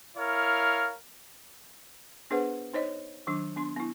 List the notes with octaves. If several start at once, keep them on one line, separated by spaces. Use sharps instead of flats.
E4 A#4 C#5 F5
B3 D4 G#4 B4 C5 F#5
D#4 C5 C#5 D#5
D#3 F#3 D4
B3 D4 C6
B3 E4